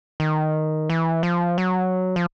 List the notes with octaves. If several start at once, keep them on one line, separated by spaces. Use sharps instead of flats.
D#3
E3
F3
F#3
F3